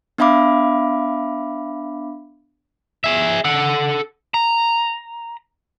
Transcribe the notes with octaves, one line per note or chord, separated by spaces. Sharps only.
B3 D4 E5 F5 B5 D6
G#4 E5
A4 F#5
A#5